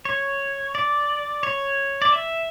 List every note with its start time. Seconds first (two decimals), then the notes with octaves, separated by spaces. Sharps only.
0.05 C#5
0.75 D5
1.43 C#5
2.02 D5
2.12 E5